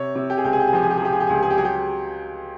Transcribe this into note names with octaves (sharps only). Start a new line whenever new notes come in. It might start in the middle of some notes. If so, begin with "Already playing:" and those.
Already playing: C3 C#5
C3
G4
G#4
C#2 G4
G#4
G4
G#4
F3 G4
G#4
G4
G#4
F3 G4
G#4
G4
G#4
C#2
G4
G#4
G4
F#3 G#4
G4